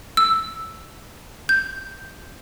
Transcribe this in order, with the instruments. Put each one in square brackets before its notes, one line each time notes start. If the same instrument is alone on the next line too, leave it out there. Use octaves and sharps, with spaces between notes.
[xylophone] E6
G6